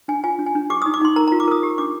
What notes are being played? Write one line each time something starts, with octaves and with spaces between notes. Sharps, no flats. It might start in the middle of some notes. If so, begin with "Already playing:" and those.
D4 G#5
F4 G#5
D4
G#5
D4
G4 D6
D#6
D#4
D6
D#4 C6
A#4 A#5
A#5
F4
D6
A#4 D#6
G4
D4 D6